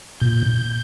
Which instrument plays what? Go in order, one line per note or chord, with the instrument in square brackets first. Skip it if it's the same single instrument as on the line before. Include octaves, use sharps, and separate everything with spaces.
[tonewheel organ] A#2 G6